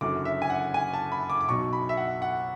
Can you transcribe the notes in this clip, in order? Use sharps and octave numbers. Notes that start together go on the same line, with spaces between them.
F#1 F#2 D3 F#3 D6
E5
G#5
F#5
G#5
A5
B5
D6
D6
B1 B2 F#3 C#6
B5
E5
F#5
F#5